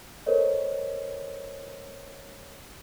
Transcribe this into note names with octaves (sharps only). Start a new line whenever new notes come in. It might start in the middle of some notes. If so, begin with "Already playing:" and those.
A4 A#4 C5 C#5 D#5